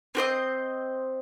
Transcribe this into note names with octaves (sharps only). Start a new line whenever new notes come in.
C4 F#4 C5 D#5